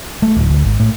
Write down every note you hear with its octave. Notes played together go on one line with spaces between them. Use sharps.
A3
D1
D2
G#1
A2